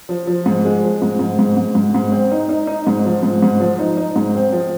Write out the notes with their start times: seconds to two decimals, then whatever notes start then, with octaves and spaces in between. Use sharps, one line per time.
0.09 F3
0.27 F3
0.46 G#2
0.65 G#3
0.84 F3
1.02 G#2
1.19 G#2
1.39 G#2
1.57 G#2
1.75 G#2
1.95 G#2
2.12 C4
2.32 D#4
2.49 D#4
2.67 D#4
2.87 G#2
3.05 F3
3.23 G#2
3.43 G#2
3.60 F3
3.79 D#4
3.97 D#4
4.16 G#2
4.35 C4
4.52 F3